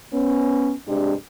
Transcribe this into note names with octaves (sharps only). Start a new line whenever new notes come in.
B3 C#4
G2 C3 G#3 D4 G4